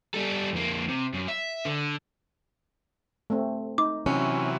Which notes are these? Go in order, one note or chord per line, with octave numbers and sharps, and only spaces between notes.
G3 A4
F2 A#3
C3
F#2
E5
D3
A3 C4
D#4 D6
C3 E3 F#3 C#4